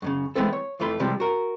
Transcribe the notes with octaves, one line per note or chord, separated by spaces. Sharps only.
F#2 A2 C#3
E3 G#3 A3 B3 C4 A4
C#5
F2 E3 A3 F4 B5
C3 E3 F3 G3 G#3 C4
F#4 A#4